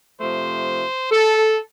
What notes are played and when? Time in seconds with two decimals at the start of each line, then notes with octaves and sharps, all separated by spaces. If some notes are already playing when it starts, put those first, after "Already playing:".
0.20 C3 F3 A3 C5
1.11 A4